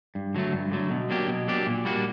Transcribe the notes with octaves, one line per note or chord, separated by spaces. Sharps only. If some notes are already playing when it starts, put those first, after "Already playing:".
G2
D3 F#3 A3
G2
D3 F#3 A3
B2
F#3 A#3 D4 G4
B2
F#3 A#3 D4 G4
A#2
G3 A#3 D4 F#4